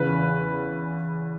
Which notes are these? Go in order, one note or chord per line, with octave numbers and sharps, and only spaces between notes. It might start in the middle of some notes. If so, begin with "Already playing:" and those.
Already playing: E2 C#3 E3 B4